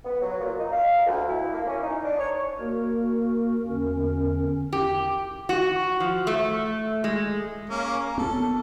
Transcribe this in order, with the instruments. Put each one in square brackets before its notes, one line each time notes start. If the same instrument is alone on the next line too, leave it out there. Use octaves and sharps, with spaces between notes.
[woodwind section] B3
F#3
A#2
D#4
F5
D2
E4
A#3
C#4
D#4
D4
C#5
[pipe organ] A#3 F#4 A#4
E2 D3 C#4 A#4
[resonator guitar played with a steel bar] G4
F#4
F3
A3
G#3
[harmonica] A#3 C#4
[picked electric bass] B3 [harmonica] A4